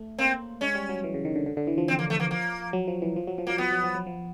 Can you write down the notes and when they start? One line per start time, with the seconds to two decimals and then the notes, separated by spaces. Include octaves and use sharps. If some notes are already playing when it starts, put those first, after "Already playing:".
Already playing: A3
0.18 A#3 C4
0.61 G#3 C#4
0.75 G3
0.89 F#3
1.04 E3
1.14 C#3
1.25 D#3
1.35 D3
1.46 D3
1.57 D3
1.67 E3
1.78 F3
1.88 C4
1.99 A#3
2.10 A3
2.20 A#3
2.31 A#3
2.73 F#3
2.88 F3
3.02 E3
3.16 F3
3.27 F#3
3.38 F3
3.47 F#3 A#3
3.58 F3 B3
3.72 F#3
3.84 F3
3.95 F#3
4.07 F3